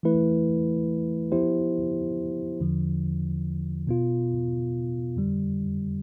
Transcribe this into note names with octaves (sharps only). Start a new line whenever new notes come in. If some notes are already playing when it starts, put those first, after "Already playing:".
E3 A3 E4 B4
F3 B3 E4 G4 C5
E2 D3 F3
B2 B3 F4
F2 D3 G3